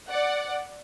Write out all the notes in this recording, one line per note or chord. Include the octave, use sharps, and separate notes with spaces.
D5 F#5